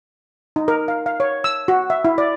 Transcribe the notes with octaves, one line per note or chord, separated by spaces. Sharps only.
D#4
A#4
F5
F5
C#5
E6
F#4
E5
E4
D5